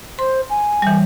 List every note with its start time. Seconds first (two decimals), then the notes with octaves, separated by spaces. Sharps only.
0.19 C5 C6
0.50 G#5
0.82 E3 G3